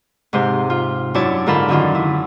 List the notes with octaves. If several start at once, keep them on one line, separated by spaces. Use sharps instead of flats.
G#2 C3 C5
F4
F#2 D4 E4 C#5 A5 D6
G#2 D3 F4 A#4 A5 B5
F#2 D3 D#3 C#4 F4
E4